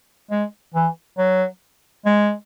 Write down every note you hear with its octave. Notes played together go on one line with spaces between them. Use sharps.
G#3
E3
F#3
G#3